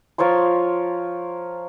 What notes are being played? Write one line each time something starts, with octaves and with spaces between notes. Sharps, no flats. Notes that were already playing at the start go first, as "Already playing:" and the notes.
F3 A#4 C#5 C6